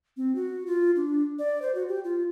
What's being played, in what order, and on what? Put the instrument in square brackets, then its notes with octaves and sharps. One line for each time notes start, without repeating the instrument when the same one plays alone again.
[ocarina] C4
F#4
F4
D4
D5
C5
F#4
G4
F4